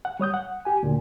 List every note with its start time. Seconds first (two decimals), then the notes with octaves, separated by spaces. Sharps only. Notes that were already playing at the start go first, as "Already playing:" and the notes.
0.05 F#5
0.20 G3 C#5 D#6 G6
0.34 F#5
0.65 G4 G#5
0.83 D2 A#2